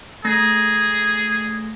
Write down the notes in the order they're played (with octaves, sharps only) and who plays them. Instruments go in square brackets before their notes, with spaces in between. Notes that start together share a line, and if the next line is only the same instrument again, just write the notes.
[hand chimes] A3 A#6 [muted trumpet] G#4